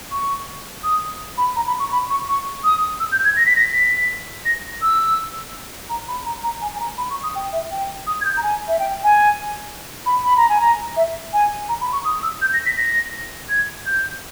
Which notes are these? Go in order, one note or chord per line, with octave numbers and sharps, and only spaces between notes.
C#6
D#6
B5
A#5
B5
C#6
B5
C#6
C#6
D#6
E6
G6
G#6
A#6
B6
A#6
B6
A#6
E6
A#5
B5
A#5
A#5
G#5
G#5
A#5
B5
C#6
D#6
G5
E5
G5
D#6
G#6
G6
A#5
G#5
E5
G5
G#5
B5
B5
A#5
G#5
A#5
E5
G#5
A#5
B5
C#6
D#6
E6
G6
A#6
B6
A#6
G#6
G6